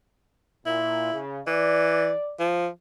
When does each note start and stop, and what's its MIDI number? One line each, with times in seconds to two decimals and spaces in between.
0.66 1.12 46
0.66 1.18 64
1.13 1.40 49
1.47 2.12 52
1.47 2.34 74
2.39 2.68 53